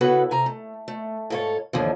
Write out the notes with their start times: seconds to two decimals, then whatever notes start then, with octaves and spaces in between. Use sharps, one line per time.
0.01 C#3 B3 E4 F#4 A4 B4
0.31 C3 G#5 A#5
0.46 A3
0.88 A3
1.30 G#2 F4 A4 B4 C#5
1.73 D#2 G#2 D3 E3 F3